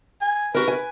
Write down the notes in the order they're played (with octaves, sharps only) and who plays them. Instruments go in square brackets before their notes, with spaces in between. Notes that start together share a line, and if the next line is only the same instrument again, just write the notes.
[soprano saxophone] G#5
[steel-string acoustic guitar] F#4 A#4 [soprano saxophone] B4
[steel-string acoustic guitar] G#5